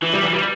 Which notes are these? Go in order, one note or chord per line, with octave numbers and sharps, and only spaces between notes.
E3
G3
E3
G3